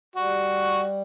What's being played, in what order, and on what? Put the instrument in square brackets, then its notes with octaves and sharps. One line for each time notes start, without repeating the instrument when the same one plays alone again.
[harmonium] G3 [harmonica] F#4